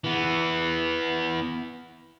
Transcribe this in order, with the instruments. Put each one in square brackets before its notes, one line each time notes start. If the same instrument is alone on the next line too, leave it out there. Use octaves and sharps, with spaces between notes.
[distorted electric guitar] E3 B3